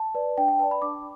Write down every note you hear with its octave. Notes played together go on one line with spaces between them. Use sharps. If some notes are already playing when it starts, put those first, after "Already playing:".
Already playing: A5
B4 D5
D4 G5
G5
B4 D5 A5
B5
D4 D6